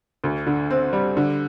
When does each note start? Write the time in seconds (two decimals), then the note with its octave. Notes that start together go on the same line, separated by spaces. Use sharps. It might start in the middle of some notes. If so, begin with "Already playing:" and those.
0.24 D2
0.47 D3
0.71 C4
0.93 G3
1.17 D3